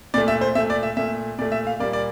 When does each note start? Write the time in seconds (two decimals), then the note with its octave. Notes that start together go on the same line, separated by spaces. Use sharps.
0.14 A#2 A3 D5
0.28 E5
0.41 C5
0.55 A#2 E5
0.58 A3
0.70 D5
0.83 E5
0.97 A#2 A3 E5
1.39 A#2 D5
1.42 A3
1.52 E5
1.67 F5
1.80 A#2 G3 A#3 D5
1.93 D5